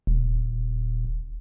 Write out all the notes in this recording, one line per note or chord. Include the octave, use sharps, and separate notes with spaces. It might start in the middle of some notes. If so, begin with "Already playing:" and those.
D#1